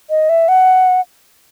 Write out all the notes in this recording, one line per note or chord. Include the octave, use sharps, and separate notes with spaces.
D#5
E5
F#5